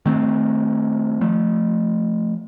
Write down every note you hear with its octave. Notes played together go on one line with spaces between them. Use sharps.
D#3 A3 C4
F3 A3